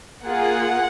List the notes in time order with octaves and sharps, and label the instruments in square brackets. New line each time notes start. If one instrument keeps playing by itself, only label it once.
[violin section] A#3 F4 G#4 F#5